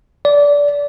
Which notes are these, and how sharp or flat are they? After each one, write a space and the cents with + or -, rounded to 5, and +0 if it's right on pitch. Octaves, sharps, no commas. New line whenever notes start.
D5 -20